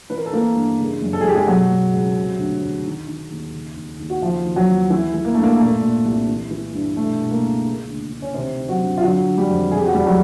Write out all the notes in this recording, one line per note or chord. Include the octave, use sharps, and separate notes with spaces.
E3 B4
A#4
A4
E3 A#3 A#4
G2
C#3
F#2
A4
G#4
F#2 G4
G#3 G#4
B2 F#3 F#4
B2
C#2
C3
D2
D2
D#3
D#3
D#2
C#3
D#2
D#2
F#4
C#3 F3 F4
D#2
F#3 F#4
D#2
E3 E4
E3
A#3
G2 A3
A#3
A#2 A3
A#2
C2
E3
E3
G2
B2 A3
B2
A#3
C#2
C#3
D2
D2
C#4
C3 D#3 C4
D#3
F#3 F#4
G2
F4
D3 F#3 F#4
D3
G3 G4
F2
C3 G#4
G4
F#4
E2 G3 G4
F#3 F#4